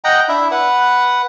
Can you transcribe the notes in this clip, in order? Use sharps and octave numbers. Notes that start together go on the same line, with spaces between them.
D#5 F#5 G5 A#5
D4 E4 E5
B4 F#5